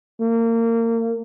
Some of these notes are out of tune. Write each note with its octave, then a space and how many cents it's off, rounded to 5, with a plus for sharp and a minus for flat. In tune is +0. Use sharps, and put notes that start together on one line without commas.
A#3 -30